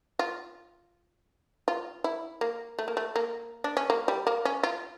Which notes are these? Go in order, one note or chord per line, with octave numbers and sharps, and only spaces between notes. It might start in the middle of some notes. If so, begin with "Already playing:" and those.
F4
F4
E4
A#3
A3
A#3
A3
A#3
D4
C#4
A#3
G3
A#3
C#4
F4